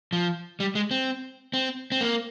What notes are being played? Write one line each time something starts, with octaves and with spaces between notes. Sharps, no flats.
F3
G3
G#3
C4
C4
C4
A#3